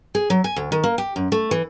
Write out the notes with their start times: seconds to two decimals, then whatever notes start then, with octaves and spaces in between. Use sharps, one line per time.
0.15 G#4
0.30 F#3
0.44 G#5
0.56 D2
0.72 D#3
0.84 A#3
0.98 G4
1.16 F#2
1.32 A3
1.51 E3